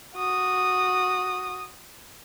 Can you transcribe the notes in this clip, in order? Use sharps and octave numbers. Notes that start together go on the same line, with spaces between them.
F#4 D#6